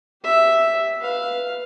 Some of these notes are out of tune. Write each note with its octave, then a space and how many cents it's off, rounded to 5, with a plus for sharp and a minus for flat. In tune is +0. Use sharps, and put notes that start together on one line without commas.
G4 +0 E5 +0
B4 -5 F5 +0